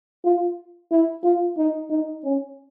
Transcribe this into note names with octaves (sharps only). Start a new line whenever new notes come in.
F4
E4
F4
D#4
D#4
C#4